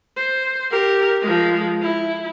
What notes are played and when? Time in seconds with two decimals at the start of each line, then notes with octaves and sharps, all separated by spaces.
0.17 C5
0.70 G4 A#4
1.22 F3 G#3
1.82 E4